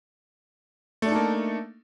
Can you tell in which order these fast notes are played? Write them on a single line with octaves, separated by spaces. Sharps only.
A3 D4 A4 D#4 A#3